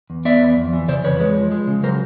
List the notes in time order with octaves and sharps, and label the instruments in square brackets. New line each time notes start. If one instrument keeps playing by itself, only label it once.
[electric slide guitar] E2
B3 D5 E5
E2
F2
E3
C#3 C5 D5
F2 B4 C#5
G#3
F3
G#3
C#3
F#3 A#4 C5